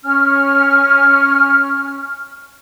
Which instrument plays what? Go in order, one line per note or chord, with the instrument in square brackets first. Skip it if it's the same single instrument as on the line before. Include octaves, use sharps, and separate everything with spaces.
[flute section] C#4 F6